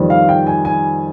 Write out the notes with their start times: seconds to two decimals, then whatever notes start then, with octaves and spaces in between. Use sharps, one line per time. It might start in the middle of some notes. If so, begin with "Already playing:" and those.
Already playing: F2 D#3 G3
0.10 F5
0.29 G5
0.47 G#5
0.65 G#5